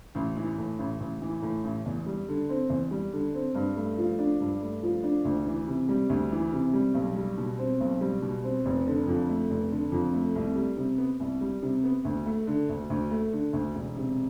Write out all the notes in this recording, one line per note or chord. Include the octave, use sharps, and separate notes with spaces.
A1
E3
A2
A1
A1
E3
A2
A1
E2
G3
D3
C4
E2
G3
D3
C4
G2
A3
F3
D4
G2
A3
F3
D4
D2
E3
C3
G3
D2
E3
C3
G3
B1
G3
B2
C4
B1
G3
B2
C4
F1
D3
F2
A3
F1
D3
F2
A3
C2
G3
C3
B3
C2
G3
C3
B3
D2
A3
D3
D2
D2
A3
D3
D2
E1
C3